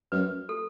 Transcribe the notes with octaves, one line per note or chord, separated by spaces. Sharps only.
F#2 B4
A4